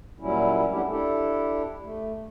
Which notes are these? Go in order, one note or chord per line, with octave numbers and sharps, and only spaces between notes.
A#2 F#3 G3 C#4 E4
F#3 A3 B3 D4 E4 G4
D4 E4 G4 A4
A3